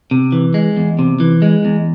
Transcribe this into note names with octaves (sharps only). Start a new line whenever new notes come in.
C3
E3
G#3
E2
C3
E3
G#3
E2